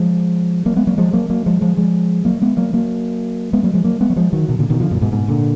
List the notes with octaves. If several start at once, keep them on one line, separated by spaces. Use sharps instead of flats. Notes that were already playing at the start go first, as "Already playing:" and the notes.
Already playing: F3 G#3
F#3 A#3
G#3 B3
F#3 A#3
F3 G#3
F#3 A#3
F#3 A#3
F3 G#3
F3 G#3
F3 G#3
F#3 A#3
G#3 B3
F#3 A#3
F#3 A#3
G#3 B3
F#3 A#3
F3 G#3
F#3 A#3
G#3 B3
F#3
F3 G#3
D#3 F#3
B2 D#3
A#2 D3
B2 D#3
D3 F3
F#2 A#2
G#2 B2
G#2 B2
A#2 D3